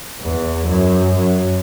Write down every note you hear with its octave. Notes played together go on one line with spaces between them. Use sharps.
E2
F#2
F#2